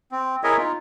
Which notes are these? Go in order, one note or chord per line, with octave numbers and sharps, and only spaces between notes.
C4
E4 G#4 A#4 C#5 D#5 E5
D#4 F4